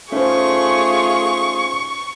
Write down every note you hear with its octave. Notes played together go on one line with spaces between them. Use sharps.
A3 C#4 D#4 F4 G#4 C5 C#6